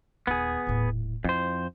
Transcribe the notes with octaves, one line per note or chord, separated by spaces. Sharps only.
D#1 D#2 B3 G#4
D#1 A2
F2 E4 C5